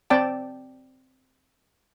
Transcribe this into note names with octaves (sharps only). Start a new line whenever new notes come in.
C4 D5 G5 A5